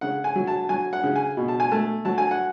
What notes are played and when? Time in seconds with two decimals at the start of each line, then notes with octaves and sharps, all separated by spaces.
0.01 C#3 F#5
0.24 G#5
0.36 F#3
0.47 A5
0.69 F#3 G#5
0.93 F#5
1.04 C#3
1.16 G#5
1.37 B2
1.48 A5
1.60 G#5
1.72 A3 A5
2.05 F#3 A5
2.18 G#5
2.31 F#5